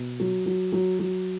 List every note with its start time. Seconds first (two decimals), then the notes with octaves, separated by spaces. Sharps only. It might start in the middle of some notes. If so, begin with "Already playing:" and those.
Already playing: B2
0.20 F#3
0.46 F#3
0.72 F#3
0.99 F#3